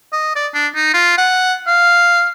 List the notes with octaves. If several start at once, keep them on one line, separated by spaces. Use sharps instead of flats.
D#5
D5
D4
D#4
F4
F#5
F5